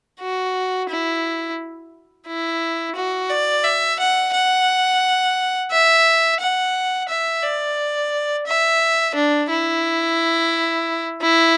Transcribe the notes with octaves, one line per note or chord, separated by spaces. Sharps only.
F#4
E4
E4
F#4
D5
E5
F#5
F#5
E5
F#5
E5
D5
E5
D4
E4
E4